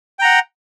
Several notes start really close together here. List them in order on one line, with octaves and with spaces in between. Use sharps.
G5 A#5 F#5